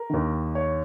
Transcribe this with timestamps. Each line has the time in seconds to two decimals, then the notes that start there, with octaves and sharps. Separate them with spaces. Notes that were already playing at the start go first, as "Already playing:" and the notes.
Already playing: A#4
0.10 D#2 D#3
0.55 C#5